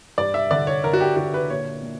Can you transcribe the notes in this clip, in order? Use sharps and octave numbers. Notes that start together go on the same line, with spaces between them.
G2 D5
E5
D3 D5
C#5
D3 A#4
F#4
G4
D3 F#4
B4
A#2 C#5
A#2